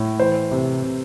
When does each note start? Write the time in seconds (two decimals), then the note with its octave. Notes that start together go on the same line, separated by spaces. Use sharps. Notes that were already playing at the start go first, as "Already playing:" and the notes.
Already playing: A2
0.19 E3 C5
0.51 C3
0.83 C3